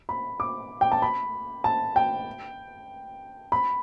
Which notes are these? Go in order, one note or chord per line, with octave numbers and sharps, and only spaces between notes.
B5
D6
G5
A5
B5
A5
G5
B5